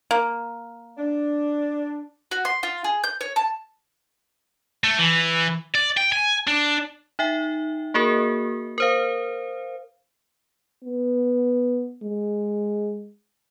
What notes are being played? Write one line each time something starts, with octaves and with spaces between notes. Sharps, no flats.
A#3
D4
F#4
C6
F4
G#4
G6
C#5
A5
A3
E3
D5
G5
G#5
D4
D#4 E5 G5
A#3 F#4 G#4 A#4
A#4 C5 F5
B3
G#3